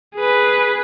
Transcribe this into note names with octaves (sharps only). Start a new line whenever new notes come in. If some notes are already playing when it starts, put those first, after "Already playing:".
G#4 B4